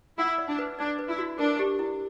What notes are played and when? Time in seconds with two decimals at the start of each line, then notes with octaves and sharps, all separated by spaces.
0.18 E4 F#5
0.38 D5
0.49 D4
0.59 B4
0.79 D4 D5
0.99 B4
1.08 E4
1.18 F#4
1.38 D4 A#4
1.59 G4
1.79 E4